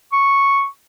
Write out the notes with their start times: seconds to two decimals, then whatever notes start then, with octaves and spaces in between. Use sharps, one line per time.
0.12 C#6